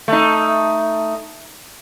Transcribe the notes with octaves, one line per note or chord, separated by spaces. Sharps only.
A3 D#4